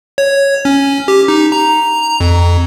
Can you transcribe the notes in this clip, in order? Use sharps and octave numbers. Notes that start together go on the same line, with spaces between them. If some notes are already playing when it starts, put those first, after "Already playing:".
C#5
C#4
G4
D#4
A#5
F2